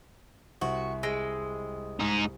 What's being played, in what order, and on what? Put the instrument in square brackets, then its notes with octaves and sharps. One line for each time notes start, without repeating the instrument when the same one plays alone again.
[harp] C2 [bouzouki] F#4
[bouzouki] G#3 [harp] E6 A#6 D7
[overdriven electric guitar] G#2 D#4